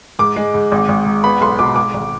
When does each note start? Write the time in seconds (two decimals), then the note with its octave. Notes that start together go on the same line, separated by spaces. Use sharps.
0.19 G#2 D6
0.36 G#3
0.54 G#2
0.72 G#1
0.89 G#1
1.06 G#2
1.24 B3 B5
1.41 B1 C6
1.59 B2 D6
1.76 G#2 D6
1.94 G#1